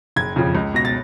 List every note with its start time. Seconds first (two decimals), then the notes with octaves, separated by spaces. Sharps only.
0.16 F#1 G#6
0.36 F2 C#3 F3
0.55 C#2
0.74 B2 A#6
0.85 A6